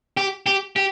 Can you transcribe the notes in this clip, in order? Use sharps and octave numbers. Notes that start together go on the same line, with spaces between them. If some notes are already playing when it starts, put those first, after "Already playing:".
G4
G4
G4